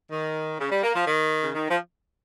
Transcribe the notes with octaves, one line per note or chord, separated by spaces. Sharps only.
D#3
C#3
G3
A#3
F3
D#3
C#3
D#3
F3